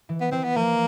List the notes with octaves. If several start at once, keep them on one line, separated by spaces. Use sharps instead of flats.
E3
B3
E3 C4
B3
F3 A#3